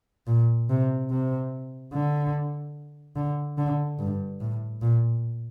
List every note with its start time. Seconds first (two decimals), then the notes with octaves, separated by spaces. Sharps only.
0.27 A#2
0.69 C3
1.10 C3
1.93 D3
3.16 D3
3.58 D3
3.99 G2
4.40 A2
4.81 A#2